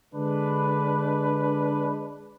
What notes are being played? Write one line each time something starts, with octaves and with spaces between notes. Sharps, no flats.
D3 G#3 D4 B4